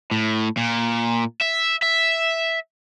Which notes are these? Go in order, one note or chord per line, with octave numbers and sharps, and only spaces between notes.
A2
A#2
E5
E5